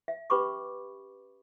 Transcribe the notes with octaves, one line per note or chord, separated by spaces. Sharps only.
E5
C#4 G4 B4 B5 C#6 D6